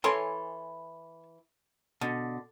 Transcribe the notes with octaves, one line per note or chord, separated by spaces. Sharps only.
E3 E4 A4 C#5 G#5 C6
B2 D3